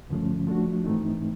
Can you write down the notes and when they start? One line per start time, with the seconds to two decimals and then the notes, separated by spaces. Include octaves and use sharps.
0.10 G2 D3 F3 A3 C#4
0.47 F3 A3 D4 F#4
0.84 G#2 E3 A3 C4 D#4